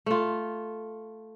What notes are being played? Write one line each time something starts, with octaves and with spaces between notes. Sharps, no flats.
A3 F4